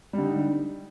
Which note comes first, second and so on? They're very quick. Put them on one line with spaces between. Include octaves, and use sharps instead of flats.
G3 D3 D#4